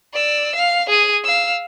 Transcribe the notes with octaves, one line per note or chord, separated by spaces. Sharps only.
D5 E6
F5
G#4 D#7
F5 E6